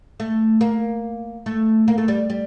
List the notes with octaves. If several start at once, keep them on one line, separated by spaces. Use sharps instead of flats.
A3
A#3
A3
A#3
A3
G3
G3